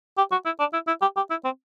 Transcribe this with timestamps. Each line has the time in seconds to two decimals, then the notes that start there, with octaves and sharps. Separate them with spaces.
0.18 G4
0.32 F#4
0.45 E4
0.60 D4
0.73 E4
0.87 E4
1.02 G4
1.16 G4
1.30 E4
1.44 C4